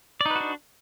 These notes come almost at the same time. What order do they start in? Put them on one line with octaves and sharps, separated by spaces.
D5 D#4 B4 F#4 D4